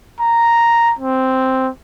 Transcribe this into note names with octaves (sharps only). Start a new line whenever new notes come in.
A#5
C4